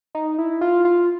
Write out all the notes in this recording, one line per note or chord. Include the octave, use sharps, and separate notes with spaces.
D#4
E4
F4
F4